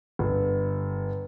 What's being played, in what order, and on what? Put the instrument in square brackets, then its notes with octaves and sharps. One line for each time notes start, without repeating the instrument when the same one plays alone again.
[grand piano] G1